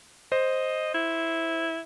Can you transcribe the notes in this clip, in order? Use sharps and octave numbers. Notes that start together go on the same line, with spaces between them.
C5 D#5
E4